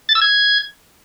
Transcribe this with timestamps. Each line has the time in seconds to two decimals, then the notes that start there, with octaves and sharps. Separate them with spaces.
0.09 A6
0.15 E6
0.22 G#6